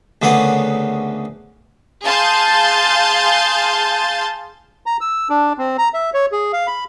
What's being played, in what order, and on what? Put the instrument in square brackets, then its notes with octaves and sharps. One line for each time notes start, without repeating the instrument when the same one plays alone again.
[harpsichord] D2 C#3 A#3 B3 F#5 D#6
[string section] G#4 F5 A5 C6 G6 A6
[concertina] A#5
E6
D4
C4
A#5
E5
C#5
G#4
F5
B5